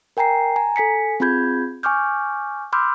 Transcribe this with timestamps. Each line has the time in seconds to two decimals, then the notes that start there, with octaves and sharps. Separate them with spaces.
0.17 A#4 G5 G#5 A#5 C7
0.56 G#5 A#5
0.76 A4 G#5 B6 C#7
1.20 C4 F4 G#4 B5 G6 G#6
1.83 G#5 C#6 D6 F6 G6
2.73 B5 C6 D6 E6 F6 G6